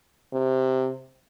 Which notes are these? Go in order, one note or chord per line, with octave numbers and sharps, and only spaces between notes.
C3